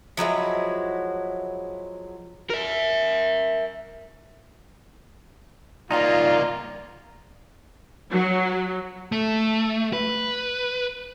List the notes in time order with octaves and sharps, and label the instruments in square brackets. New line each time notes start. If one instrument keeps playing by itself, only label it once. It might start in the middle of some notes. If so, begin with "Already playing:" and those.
[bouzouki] F3 F#3 G#3 E4
[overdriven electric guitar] A#4 E5
[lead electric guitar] C2 A#3 [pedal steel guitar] D#4 A#5 [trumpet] F4 [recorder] D5
[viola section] F#3
[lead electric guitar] A3
B4